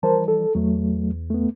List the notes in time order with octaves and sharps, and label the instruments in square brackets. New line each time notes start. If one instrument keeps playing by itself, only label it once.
[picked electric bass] E3 F3 G3 [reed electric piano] A#4 C5 A5
[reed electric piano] A4
[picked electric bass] E2 [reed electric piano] F#3 A3
[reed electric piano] A3 B3